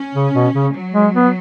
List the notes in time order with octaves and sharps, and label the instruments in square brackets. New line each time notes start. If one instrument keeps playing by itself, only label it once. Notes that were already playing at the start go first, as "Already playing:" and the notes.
Already playing: [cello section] C#4
[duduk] C#3
B2
C#3
[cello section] F#3
[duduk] G#3
B3